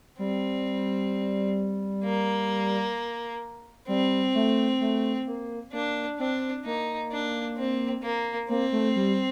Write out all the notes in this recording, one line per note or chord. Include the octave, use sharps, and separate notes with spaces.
G3 C4
A#3
G3 C4
A3
A3
A#3
A#3 D4
C4 D4
A#3 D#4
D4
C4
A#3
A#3 C4
A3
G3